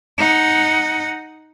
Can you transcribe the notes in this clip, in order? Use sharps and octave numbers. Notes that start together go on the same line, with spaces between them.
D#4 F#5